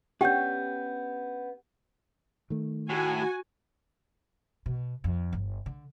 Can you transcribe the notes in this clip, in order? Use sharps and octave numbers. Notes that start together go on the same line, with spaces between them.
B3 C#4 D4 G4 F#5 G5 G6
D#3 A3
A2 F#4 G#5
B2
F2
G1
D3